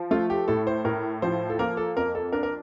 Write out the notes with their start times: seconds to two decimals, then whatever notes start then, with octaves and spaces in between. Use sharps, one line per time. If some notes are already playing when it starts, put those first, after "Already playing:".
Already playing: F3
0.11 A3 F4
0.30 G4
0.48 A2 A4
0.67 C5
0.84 A2 A#4
1.22 F3 C5
1.50 A4
1.59 A#3 A#4
1.77 A4
1.96 F2 A#4
2.15 A4
2.32 D4 A#4
2.43 A#4